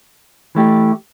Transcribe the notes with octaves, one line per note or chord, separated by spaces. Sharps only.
E3 A3 E4 G4